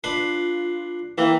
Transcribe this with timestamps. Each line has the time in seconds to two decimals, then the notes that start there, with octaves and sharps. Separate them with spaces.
0.04 D4 F4 B4 C6
1.18 E3 A#3 G5